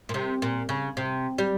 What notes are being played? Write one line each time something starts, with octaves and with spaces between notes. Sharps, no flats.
A#2
C3
A#2
C#3
C3
G3